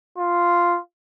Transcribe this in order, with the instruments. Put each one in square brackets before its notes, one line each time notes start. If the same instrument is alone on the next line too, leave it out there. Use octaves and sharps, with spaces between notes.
[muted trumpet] F4